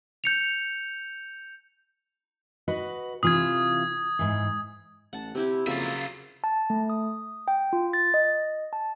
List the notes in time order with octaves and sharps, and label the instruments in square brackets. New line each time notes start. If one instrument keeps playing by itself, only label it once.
[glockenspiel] G6 C#7 F7
[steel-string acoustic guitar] F#4 B4 D#5
[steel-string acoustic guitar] C3 E3 F4 [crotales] D#6 G#6
[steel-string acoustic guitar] G#2 E3
[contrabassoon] A1 [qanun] F#5 A5
[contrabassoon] C3 [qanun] C4 E4 G4
[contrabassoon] F2 [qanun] C#3 F#3 A#3 [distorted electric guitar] F4 E5
[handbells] A5
A3
D#6
G5
F4
A6
D#5
A5